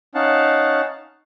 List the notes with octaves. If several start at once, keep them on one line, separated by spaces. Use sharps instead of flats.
C#4 D#4 F5 F#5 A5